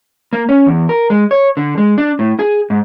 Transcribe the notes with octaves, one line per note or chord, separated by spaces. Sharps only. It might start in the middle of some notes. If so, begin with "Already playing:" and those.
A#3
C#4
E2
A#4
G#3
C#5
D3
G#3
D4
A2
G#4
G#2